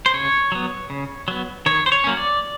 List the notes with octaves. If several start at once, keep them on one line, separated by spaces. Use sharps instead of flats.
C5
C#3 C#5
F#3 B3
C#3
F#3 B3
D#3 C#5
C5
C#5
F#3 A#3 C#4
D5